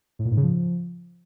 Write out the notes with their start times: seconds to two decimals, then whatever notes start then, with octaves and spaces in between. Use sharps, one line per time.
0.19 A2
0.25 A#2
0.31 G#2
0.37 C#3
0.43 F3